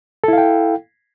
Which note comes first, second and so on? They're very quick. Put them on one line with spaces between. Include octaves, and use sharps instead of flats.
A4 E4 F5 G5